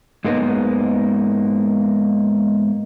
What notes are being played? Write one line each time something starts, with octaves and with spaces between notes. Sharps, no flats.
G#2 G#3 A#3 B3 D#4